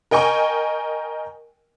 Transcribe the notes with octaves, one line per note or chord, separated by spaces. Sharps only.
A#4 D#5 G5 G#5 C#6